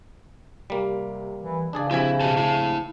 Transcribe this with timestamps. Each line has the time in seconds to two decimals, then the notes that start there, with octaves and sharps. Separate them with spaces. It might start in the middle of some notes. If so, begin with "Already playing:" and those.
0.70 C3 G3 A#3
1.39 E3
1.73 C#3 D4 G#4 D5
1.91 A#1 C3 E4 G#5
2.20 B2 G4 A5
2.37 E4 A5